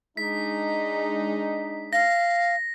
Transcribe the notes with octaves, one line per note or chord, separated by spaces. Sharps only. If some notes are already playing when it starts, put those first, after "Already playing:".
G#3 D4 D#4 B6
F5 A#6